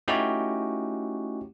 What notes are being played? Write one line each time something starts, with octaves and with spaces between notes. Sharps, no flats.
A3 C#4 D#4 E4 F#4 G4